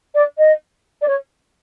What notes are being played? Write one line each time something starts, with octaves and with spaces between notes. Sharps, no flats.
D5
D#5
D5
C#5